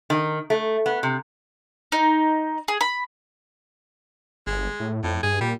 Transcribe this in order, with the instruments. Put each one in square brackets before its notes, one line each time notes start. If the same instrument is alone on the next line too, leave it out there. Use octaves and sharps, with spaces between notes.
[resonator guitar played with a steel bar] D#3
A3
B3
C3
[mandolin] D#4
G#4
B5
[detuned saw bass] G1 [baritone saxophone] G#3
[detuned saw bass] A2
[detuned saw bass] F2 [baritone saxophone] A2
[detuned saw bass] G2 [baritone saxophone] G#4
[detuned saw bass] A#2 [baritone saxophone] G3